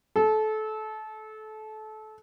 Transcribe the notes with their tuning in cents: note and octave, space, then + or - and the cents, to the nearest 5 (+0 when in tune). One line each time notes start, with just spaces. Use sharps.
A4 -25